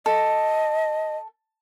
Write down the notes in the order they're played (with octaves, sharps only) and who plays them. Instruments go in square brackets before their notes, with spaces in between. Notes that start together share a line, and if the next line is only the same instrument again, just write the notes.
[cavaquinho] A4 [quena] D#5